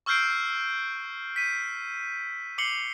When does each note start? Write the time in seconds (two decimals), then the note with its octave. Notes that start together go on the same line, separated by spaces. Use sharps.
0.06 C#6 E6 F6 G6 C7 D7
1.36 B6 D#7
2.58 D6 C7 C#7 F#7 G7